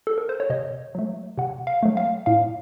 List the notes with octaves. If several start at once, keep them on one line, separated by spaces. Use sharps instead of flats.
A4
A#4
C5
C#5
C3 D#5
F#3 A3
C3 F#5
F5
F#3 A3
F5
A2 F5